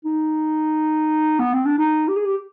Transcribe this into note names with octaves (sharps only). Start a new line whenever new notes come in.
D#4
B3
C4
D4
D#4
G4
G#4
G4